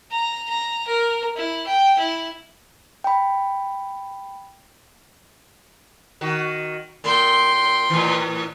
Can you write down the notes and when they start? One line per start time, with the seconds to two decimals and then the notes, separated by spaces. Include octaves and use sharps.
0.11 A#5
0.49 A#5
0.87 A#4
1.36 E4
1.66 G5
1.98 E4
3.04 G5 B5
6.21 D#3 F#4
7.04 A#2 A#3 G5 C6
7.90 A2 E3